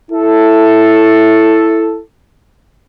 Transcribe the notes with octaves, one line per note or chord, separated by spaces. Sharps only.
E4 A4